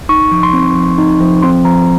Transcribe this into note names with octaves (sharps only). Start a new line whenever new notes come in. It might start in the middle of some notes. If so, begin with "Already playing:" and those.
D#4 C#6
F3
C6
C4
F3
D#4
F3
C4 C6
F3 A#5